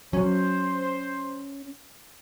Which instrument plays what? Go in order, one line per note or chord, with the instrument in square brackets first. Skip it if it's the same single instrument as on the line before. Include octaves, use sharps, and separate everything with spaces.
[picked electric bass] F#3 [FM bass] C#4 [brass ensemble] C5